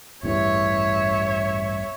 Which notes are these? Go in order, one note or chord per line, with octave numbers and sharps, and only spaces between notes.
A1 E2 G2 C#5 E5